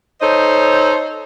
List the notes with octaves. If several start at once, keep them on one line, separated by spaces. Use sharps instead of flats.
D#4 A4 C5 C#5 D#5